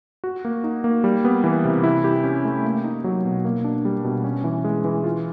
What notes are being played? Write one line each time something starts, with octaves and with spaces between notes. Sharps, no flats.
F#4
A#3
D#4
A#3
G3
B3
E3
C3
E4
G4
C#4
A3
A#3
D#4
F#3
B2
A#3
D4
G3
B2
C#4
E3
G#3
E3
F4